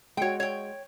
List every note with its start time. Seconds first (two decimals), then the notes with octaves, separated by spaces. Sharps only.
0.17 G#3 F#4 C#5 G5
0.40 C#5 G5